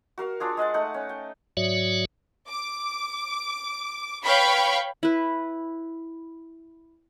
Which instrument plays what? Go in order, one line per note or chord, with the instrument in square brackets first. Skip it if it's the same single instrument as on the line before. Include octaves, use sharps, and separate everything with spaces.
[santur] F#4 A#4 F5
D4 F4 G#4
G#3 D#5 F#5 A5
A3 D#4 F#5
C#4
G5
[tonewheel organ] G#2 F#3 F#4 C#5 D5 E5
[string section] D6
B4 C#5 F5 G5 B5 C#6
[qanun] E4 B4